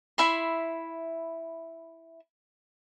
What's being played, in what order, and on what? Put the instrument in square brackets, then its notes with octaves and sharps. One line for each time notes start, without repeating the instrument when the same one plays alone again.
[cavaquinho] E4 E5 B5 C6